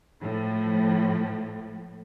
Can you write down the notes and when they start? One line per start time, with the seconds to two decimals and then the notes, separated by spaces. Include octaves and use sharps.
0.23 A2 F3